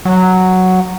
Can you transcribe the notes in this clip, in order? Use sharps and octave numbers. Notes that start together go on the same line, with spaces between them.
F#3